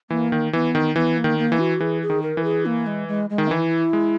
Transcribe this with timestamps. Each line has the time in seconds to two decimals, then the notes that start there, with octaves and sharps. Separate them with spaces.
0.10 E3 A#3
0.32 D#3
0.53 E3 B3
0.75 D#3
0.95 E3 B3
1.17 A#3
1.24 D#3
1.39 A#3
1.52 E3
1.59 F#4
1.80 E3 G#4
2.02 G#4
2.10 D#3
2.23 A#4
2.37 E3
2.44 G#4
2.66 A#3
2.87 G#3
3.08 G#3
3.30 G#3
3.38 D#3
3.51 E3 E4
3.93 G#3